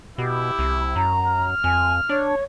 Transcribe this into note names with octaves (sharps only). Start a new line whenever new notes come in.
B2 E4 G4
C2
F#2 A#5
F6
F2 G#5
D4 C#5